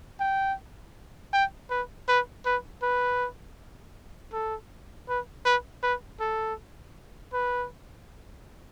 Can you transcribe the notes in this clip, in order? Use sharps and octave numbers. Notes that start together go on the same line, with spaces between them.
G5
G5
B4
B4
B4
B4
A4
B4
B4
B4
A4
B4